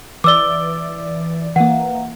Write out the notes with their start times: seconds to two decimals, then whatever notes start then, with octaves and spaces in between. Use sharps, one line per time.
0.24 E3 D5 D6 E6 G7
1.56 E3 A#3 F#5